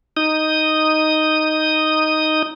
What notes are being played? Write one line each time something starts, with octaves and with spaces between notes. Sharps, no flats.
D#4 D#6